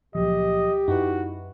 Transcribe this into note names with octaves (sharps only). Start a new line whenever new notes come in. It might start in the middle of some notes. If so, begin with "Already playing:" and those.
C#2 A#2 F3 F#3 G4 D#5
F#2 D#4 E4 F#4 B4